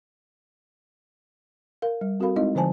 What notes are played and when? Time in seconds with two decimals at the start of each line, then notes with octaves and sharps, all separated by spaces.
1.82 A#4 F5
2.01 G3
2.20 C4 F#4 A4 A#4 F5 B5
2.36 G#3 C4 D#4 E4 D#5
2.55 D3 F3 C5 G#5 A5